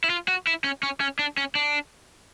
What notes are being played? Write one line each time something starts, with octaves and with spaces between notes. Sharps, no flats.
E4
F4
F#4
E4
C#4
C#4
C#4
D4
C#4
D4